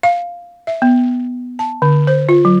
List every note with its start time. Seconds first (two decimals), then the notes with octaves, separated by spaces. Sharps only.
0.03 F5
0.67 E5
0.82 B3
1.59 A5
1.82 D3
2.07 C5
2.29 F4
2.45 F#3